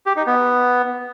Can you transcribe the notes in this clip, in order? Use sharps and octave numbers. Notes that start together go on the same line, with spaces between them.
G4
D#4
B3